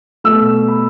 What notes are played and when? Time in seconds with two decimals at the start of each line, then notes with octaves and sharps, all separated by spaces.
0.24 B2 A3 E6
0.68 B5